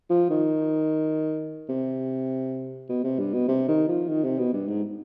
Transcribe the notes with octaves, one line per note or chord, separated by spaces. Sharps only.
F3
D#3
C3
B2
C3
G2
B2
C3
D#3
F3
D#3
C3
B2
G2
G#2